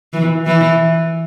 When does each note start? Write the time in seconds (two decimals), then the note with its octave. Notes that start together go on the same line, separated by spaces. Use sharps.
0.13 E3
0.46 E3